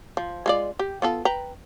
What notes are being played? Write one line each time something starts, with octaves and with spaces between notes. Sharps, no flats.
F3
G#3 F4 D5
G4
B3 F4 A4
B4 G5 A#5